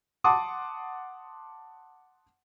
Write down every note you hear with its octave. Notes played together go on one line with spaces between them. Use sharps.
F#5 A5 C6 D6 D#6